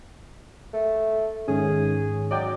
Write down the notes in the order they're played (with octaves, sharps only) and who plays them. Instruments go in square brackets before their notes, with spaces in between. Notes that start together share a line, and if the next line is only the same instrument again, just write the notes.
[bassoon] A3
[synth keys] G#2 D#3 C#4 [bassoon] G#4
[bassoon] F#3 [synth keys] D5 D#5 G5